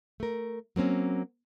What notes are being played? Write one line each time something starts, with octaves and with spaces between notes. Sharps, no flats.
A3 A#4
F#3 A#3 C4 C#4